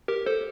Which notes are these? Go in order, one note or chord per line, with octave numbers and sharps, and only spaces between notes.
G4 A#4
A4 C5